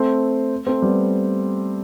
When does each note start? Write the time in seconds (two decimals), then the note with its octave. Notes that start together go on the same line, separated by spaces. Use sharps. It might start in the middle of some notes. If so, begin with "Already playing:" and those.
Already playing: A3 C4
0.67 A3 C4
0.82 G3 B3